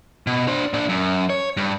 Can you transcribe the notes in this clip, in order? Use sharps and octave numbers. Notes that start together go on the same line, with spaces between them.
B2
D4 C5
A#2 D4
F#2
C#5
G2